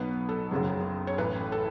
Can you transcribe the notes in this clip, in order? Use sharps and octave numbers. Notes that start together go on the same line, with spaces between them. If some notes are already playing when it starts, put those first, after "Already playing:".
Already playing: B1 B2 F#3 B3 B4
A4
F#1 F#2 C#3 F#3
C#5
A1 A2 E3 A3 B4
A4